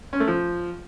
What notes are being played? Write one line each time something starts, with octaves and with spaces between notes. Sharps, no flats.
C#4
A3
F3